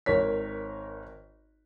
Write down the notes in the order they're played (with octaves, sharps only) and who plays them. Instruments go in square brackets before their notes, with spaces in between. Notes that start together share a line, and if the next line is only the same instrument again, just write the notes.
[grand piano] G#1 A#4 C#5 B6